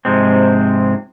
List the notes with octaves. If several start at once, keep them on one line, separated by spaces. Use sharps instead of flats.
G#2 C3 F3 G#3 C4